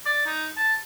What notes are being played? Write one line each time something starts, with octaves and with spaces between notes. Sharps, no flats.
D5
D#4
A5